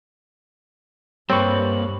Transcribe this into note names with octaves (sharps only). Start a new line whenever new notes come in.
G2 G3 A#3 C4 B4 C#5 C#6